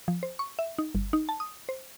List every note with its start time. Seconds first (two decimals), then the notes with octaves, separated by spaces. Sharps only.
0.08 F3
0.23 C5
0.39 C#6
0.59 E5
0.78 D#4
0.95 G1
1.13 D#4
1.29 A5
1.40 D#6
1.69 C5